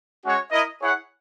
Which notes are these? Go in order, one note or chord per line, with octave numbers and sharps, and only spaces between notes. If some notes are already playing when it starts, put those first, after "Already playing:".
G#3 C#4 F#4 C#5
E4 A#4 D#5
E4 G#4 C#5 F#5